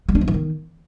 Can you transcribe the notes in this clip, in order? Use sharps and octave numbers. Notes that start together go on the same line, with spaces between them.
G#3
D4
F3
E3
D#3